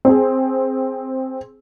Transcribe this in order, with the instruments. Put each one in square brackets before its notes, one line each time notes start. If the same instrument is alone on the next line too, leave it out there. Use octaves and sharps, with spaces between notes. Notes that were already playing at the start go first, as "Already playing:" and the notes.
[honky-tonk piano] C4 G#4